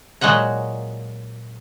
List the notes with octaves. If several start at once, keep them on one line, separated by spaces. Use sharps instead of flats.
A#2 F#3 G#3 D#5 F#5 A#5